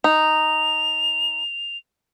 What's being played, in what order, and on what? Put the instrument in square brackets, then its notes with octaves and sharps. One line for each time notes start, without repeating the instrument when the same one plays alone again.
[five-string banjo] D#4 [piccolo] F7